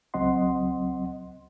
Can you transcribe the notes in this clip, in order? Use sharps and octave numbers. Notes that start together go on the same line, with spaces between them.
C#2 F#3 C4 D#5 F#5 C6